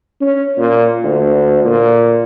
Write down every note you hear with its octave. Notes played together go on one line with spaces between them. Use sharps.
C#4
A#2
D2
A#2